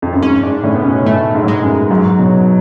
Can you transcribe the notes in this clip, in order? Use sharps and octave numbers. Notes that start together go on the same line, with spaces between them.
F2
F#2
G#2 C#4
G#2 D4
A2 C#4
B3
B2 C#4
A2 A3
G#2
F#3
G#3
F#2
G#2 F#3
B2